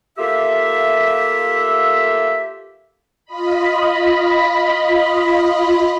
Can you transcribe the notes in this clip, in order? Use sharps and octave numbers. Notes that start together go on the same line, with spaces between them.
A#3 F4 G4 A4 E5
F4 D#5 B5